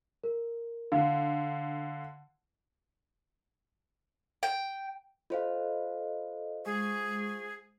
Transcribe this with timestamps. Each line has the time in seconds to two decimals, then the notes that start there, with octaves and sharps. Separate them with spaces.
0.24 A#4
0.92 D3 F5
4.43 G5
5.30 F4 A4 C5 D#5 F5
6.65 G#3 G#4 C#6